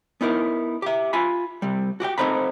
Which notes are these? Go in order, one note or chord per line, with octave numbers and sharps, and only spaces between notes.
B3 D#4 E4 A#4
G4 E5
F4 G#5 B5
C3 G3
F#4 G4 D#5 G5
C4 D#4 A4 C5 A#5 B5